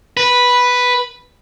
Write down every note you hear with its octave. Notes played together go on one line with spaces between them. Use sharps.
B4